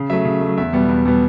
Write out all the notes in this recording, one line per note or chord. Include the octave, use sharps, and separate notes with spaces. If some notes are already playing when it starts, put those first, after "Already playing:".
Already playing: C#3
F#3 A3 E5
C#3
F#3 A3
E2 E5
B2 G3 B3
E2
B2 G3 B3